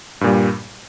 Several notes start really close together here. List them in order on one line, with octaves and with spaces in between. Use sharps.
G2 A#2 G3